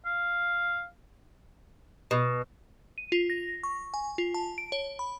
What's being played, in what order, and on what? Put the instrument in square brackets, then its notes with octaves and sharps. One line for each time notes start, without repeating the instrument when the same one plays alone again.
[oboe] F5
[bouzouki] B2
[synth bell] D#7
F4
A#6
C#6
G#5
F4
A5
D7
C#5
B5